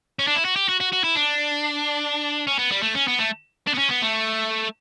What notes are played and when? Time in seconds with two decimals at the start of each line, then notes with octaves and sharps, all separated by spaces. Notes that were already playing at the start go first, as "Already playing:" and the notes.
0.19 C#4
0.27 D4
0.36 E4
0.45 F#4
0.56 G4
0.69 F#4
0.81 F#4
0.93 F#4
1.04 E4
1.16 D4
2.47 C#4
2.59 B3
2.71 G3
2.83 A3
2.95 C#4
3.08 B3
3.19 A3
3.67 D4
3.74 B3
3.79 C#4
3.91 B3
4.03 A3